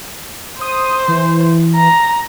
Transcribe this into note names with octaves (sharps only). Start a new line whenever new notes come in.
C5 D#6
E3
A#5